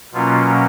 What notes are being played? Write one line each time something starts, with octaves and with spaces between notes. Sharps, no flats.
B2 F#3 A#3 C#4 F4